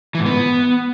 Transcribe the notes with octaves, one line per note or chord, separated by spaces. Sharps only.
E3
G#2
B3